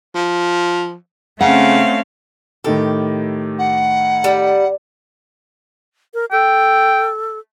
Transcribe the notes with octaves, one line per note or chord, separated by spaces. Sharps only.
F3
C#3 A3 C4 C#4 F5 F#5
A2 D#3 G4 A4
F#5
G3
A#4
A4 G5